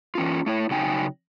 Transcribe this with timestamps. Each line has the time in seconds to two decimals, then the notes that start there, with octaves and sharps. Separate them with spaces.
0.15 E3 C#4 F4
0.46 A3 E4 C#5
0.71 C#3 F#3 D#4 G5 G#5